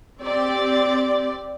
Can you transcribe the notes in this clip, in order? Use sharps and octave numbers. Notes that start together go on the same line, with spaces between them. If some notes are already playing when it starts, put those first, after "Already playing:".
C4 G4 D5